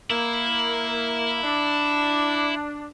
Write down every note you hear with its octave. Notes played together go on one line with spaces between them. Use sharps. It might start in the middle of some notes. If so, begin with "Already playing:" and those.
A#3 E4
D4